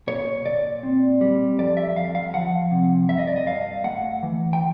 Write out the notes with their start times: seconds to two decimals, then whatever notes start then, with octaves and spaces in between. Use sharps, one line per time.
0.07 A#2 C#5
0.45 A#2 D5
0.83 C4
1.21 G3
1.59 F2 D5
1.77 E5
1.96 F2 F5
2.15 F5
2.34 F3 F#5
2.71 C3
3.09 G2 E5
3.18 D#5
3.27 D5
3.36 D#5
3.46 G2 F5
3.84 A3 F#5
4.23 E3
4.53 G5